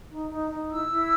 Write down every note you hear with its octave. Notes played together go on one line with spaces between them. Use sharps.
D#4
D#4
D#4
E4 E6
E4